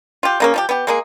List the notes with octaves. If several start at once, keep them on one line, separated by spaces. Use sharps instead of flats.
F4 G4
C#3 A#3 C#4
F3 D#4 G4
B3 G4
G#3 A#3 G#4